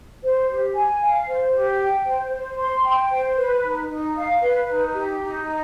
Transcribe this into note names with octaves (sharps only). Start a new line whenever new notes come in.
C5
G4
G#5
F5
C5
G4
G5
C5
C5
C6
G5
C5
B4
D#4
D#4
F5
B4
D#4
G4
D#4
D#5